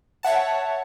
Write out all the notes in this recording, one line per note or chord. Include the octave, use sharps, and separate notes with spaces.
C#5 E5 F#5 A5